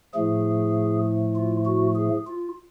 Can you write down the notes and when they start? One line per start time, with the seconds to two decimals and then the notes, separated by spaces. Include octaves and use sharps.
0.14 A2 F3 A3 G#4
1.35 F4
1.66 F#4
1.96 G#4
2.27 F4